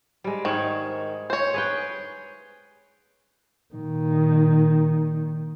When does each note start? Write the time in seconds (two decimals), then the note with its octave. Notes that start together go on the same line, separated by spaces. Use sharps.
0.24 G3 G#3
0.45 G#2 D#3 C#5
1.30 C5 C#5
1.54 G#4 B4 G5
3.75 A#2 D#3